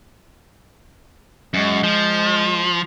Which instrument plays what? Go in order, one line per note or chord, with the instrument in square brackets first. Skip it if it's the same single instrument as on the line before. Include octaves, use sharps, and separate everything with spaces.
[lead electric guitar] F#2 [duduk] G#3
[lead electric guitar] F3